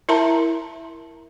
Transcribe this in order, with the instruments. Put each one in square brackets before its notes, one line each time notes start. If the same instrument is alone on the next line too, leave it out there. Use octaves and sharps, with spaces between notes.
[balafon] E4 A#4 E5 A5 A#5 C6